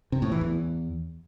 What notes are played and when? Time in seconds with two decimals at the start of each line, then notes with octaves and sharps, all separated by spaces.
0.12 C3
0.22 A2
0.32 E3
0.41 E2